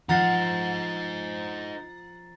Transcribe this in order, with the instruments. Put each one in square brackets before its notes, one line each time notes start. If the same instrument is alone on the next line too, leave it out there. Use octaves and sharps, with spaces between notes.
[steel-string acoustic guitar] F3 [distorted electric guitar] D#4 C5 [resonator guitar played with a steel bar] F#5 [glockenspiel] A#5 A6 C7